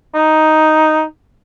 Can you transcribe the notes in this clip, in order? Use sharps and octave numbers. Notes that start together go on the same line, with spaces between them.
D#4